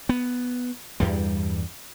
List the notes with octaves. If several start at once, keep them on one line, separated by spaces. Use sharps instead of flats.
B3
E2 G2 G3